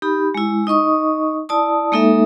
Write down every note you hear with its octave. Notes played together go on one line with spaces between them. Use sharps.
D#4 G4 B5
G#3 E4
D#4 D#5 C#6 D#6
E4 D5 A5 D#6
G#3 A#3 D#4 A4 E5